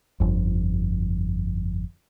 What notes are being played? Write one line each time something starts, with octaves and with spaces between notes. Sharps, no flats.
G1 F2